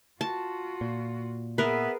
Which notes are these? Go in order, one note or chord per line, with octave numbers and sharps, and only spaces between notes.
F4 F#4 A5
A#2
B3 G#4 A#4 B4 E5